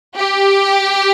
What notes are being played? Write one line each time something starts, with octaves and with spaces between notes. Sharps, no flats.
G4